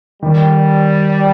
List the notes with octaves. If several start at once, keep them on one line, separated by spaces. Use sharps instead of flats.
D#3 G3